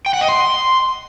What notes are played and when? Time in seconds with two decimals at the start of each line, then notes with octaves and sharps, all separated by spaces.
0.06 G5
0.14 F#5
0.21 D#5
0.29 C6